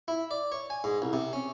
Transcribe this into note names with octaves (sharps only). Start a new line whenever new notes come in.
E4
D5
C#5
G#5
G#2
C2
C3
C#4